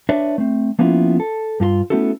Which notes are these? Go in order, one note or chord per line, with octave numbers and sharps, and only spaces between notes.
D4 B4 C#5 D5 E5
A3 C4
F3 A#3 B3 C#4 E4 F4
A4
G2 F4 G4 C6
A3 B3 C#4 E4 F#4 A4